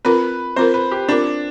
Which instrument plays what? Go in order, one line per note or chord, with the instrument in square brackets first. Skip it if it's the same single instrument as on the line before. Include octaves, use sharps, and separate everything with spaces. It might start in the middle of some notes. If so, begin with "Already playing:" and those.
[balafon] C4 F4 A#4 [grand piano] B4
[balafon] C4 F4 A#4 [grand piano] C5
[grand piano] B4
G4
[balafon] C4 F4 A#4 [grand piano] D4